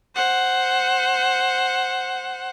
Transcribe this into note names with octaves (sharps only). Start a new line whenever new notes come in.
C5 F#5